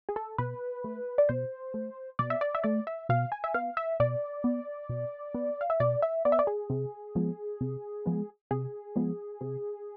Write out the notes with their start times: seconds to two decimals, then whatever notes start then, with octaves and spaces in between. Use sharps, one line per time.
0.09 G#4
0.16 A4
0.38 B2 B4
0.84 A3
1.18 D5
1.29 B2 C5
1.74 A3
2.19 B2 D5
2.30 E5
2.41 D5
2.55 E5
2.64 A3 D5
2.87 E5
3.09 B2 F5
3.32 G#5
3.44 E5
3.54 B3 F5
3.77 E5
4.00 B2 D5
4.44 B3
4.89 B2
5.34 B3
5.61 F5
5.70 E5
5.80 B2 D5
6.02 E5
6.25 B3 D5
6.32 E5
6.39 D5
6.47 G#4
6.70 C3
7.15 F3 G#3 B3
7.61 C3
8.06 F3 G#3 B3
8.51 C3 G#4
8.96 F3 G#3 B3
9.41 C3